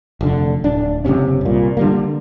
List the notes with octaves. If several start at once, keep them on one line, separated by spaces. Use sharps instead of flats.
F1 D3
D1 D4
F#1 B1 C3 C#4
C2 A#2
D3 G3 A#3